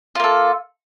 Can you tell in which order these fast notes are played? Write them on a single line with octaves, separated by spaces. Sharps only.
F4 A#3 A4